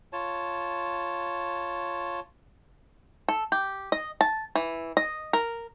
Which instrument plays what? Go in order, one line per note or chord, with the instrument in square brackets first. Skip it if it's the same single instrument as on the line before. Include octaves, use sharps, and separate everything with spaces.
[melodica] F4 C#5 A5
[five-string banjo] A4
G4
D#5
A5
E3
D#5
A#4